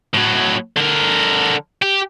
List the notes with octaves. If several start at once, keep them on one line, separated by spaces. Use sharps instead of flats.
A2 F#3
D3 A#4
G4